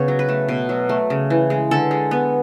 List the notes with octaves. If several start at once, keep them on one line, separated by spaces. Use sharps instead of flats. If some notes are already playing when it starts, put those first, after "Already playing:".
Already playing: C#3 B3 C#5
F#3
B4
A3
B2
F#3
A3
C#3
E3
G#3
D3 A4
G#3
B3